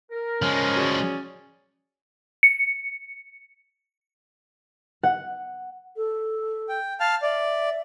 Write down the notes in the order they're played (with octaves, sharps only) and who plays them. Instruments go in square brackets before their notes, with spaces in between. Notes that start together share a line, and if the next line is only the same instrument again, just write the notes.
[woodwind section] A#4
[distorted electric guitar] F3 G#3 [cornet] C#4 [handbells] F6
[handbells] F#4 G#4 D5
[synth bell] C#7
[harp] F#5
[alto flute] A4
[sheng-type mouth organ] G5
F5 A5 F6
[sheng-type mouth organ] D5 [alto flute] E5